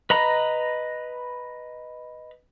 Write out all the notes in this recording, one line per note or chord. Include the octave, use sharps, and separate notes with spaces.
B4 D#5 A#5 B5